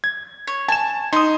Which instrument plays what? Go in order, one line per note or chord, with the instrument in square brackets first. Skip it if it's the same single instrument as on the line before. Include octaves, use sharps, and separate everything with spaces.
[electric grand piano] G#6
[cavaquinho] C#5
[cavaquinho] G#5 [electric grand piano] A5 E7
[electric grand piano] D#4 D#6 [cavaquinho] C6